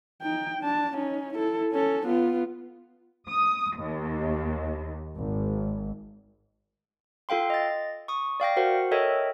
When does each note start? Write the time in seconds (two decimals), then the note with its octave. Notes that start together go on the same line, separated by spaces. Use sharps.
0.22 D#4 G5
0.61 D4 A5
0.95 C#4 D#4
1.34 E4 A4
1.73 C#4 A4
2.06 B3 F4
3.29 D#6
3.78 D#2
5.16 G#1
7.29 F4 A4 F5 G5 C6
7.50 D#5 A6
8.08 C#6 D#6
8.40 D5 F5 G5 A#6
8.56 F#4 A#4 C5 F#5
8.92 A4 A#4 C#5 D#5 E5 G5